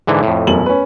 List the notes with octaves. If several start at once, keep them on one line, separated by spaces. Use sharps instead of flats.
G#2 D3 E3
F2 A2
E1 F#2 F#7
C#4 B4